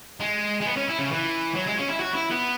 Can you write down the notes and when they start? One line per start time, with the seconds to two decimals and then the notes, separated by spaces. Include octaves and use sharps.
0.20 G#3
0.61 G#3
0.66 B3
0.76 C#4
0.89 E4
0.99 C#3
1.11 E3
1.55 F#3
1.67 G#3
1.78 C#4
1.89 E4
2.01 F#4
2.15 E4
2.31 B3